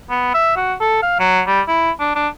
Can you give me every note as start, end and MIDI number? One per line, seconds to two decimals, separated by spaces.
0.10 0.30 59
0.34 0.56 76
0.56 0.74 66
0.81 1.01 69
1.02 1.18 77
1.20 1.42 54
1.47 1.61 55
1.68 1.91 64
2.00 2.14 62
2.15 2.28 62